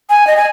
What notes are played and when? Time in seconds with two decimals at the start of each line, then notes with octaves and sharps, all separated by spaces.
0.10 G#5
0.27 D#5
0.37 G#5